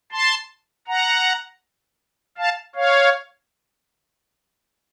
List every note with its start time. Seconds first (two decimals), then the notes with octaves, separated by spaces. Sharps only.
0.12 A5 C6
0.87 F#5 A#5
2.38 F5 A5
2.75 C#5 F5